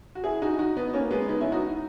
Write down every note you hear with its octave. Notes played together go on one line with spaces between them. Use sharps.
F#4
E4 G#4
D#4 F#4
D#4 F#4
B3 D#4
A#3 C#4
G#3 B3
B3 D#4
C#4 E4
D#4 F#4